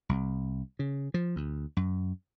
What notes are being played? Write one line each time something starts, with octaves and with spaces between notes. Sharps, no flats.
C2
C#3
F3
D2
F#2